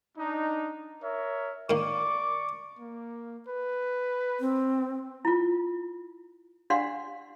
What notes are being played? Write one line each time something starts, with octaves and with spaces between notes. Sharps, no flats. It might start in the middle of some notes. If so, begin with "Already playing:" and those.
D4 D#4
A#4 C#5 E5
D#3 A#3 D5 C#6 D6
A#3
B4
C4
E4 F4
D4 G4 D5 F5 F#5 C6